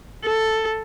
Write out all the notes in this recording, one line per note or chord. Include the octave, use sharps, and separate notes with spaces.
A4